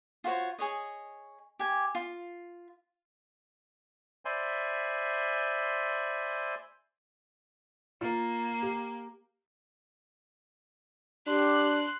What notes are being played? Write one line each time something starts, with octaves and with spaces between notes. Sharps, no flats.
F4 F#4 C5 C#5
G#4 C#5 D#5
G4 G#5
F4
C5 D5 E5 G#5 B5 C6
A#3 F4
G4
D4 G4 C6 F#6